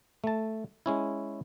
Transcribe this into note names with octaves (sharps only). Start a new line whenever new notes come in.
A3 A5
G#3 C#4 E4